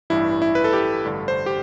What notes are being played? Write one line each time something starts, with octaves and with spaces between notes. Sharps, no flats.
A1 G2 E3 E4
E4
B4
A4
G4
A1 G2 D3
C5
G4